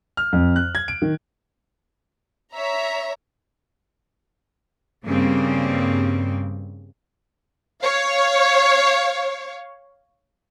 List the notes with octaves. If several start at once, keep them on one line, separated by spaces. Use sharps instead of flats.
F6
F2
F#6
G#6
D7
D#3
C#5 E5 A#5
G2 C#3 A#3 C4
C#5 F5